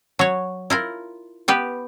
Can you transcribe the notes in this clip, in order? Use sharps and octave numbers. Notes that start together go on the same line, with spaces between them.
F#3 C#5
E4 F4 A#4
B3 G4 B4